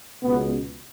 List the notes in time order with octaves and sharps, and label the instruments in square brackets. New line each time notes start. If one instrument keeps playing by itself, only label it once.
[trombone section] C#2 B2 B3